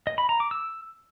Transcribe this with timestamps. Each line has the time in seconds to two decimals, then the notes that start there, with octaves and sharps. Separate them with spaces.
0.07 D#5
0.18 B5
0.29 A#5
0.40 D6
0.51 E6